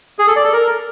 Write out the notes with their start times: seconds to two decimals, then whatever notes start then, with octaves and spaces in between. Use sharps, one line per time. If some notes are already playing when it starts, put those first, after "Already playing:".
0.19 G#4
0.27 A4
0.36 D5
0.44 A4
0.53 A#4